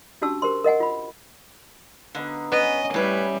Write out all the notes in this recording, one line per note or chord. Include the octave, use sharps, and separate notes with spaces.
C#4 D4 F#4 G4 A5 E6
G4 A#4 C5 C6
A#4 D#5 F#5 G#5
F4 B5
D3 B3 D#4 B4
B3 C#4 D#5
A2 G3 C#4 E4 B4